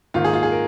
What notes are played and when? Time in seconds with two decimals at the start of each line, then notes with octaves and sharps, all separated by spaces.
0.14 G#2 D#3 A#3 F4
0.24 G#4
0.33 F4
0.43 G#4
0.52 A#4